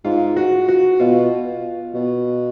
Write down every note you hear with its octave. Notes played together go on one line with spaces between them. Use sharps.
G#2 F4
F#4
F#4
B2 F4
B2